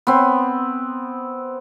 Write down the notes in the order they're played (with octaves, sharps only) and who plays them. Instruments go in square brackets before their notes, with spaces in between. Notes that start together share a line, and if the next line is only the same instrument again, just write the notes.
[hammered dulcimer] B3 C4